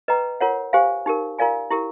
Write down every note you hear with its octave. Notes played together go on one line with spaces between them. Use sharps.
B4 D#5 G5 A#5
F4 A#4 C#5 F#5
G4 C5 F5 G#5
D#4 G4 A#4
F4 A#4 D5 F5 G#5
E4 G4 A#4